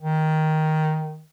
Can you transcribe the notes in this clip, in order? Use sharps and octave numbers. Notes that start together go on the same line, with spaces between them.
D#3